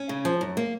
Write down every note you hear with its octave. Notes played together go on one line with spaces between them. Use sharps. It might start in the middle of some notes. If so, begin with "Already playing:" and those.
Already playing: C#4
C#3
F3
F#2
A#3